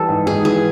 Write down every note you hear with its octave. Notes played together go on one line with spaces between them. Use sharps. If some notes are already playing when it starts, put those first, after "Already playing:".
Already playing: E3 G3 A4
G#2
G#2 G#4
E3 G#4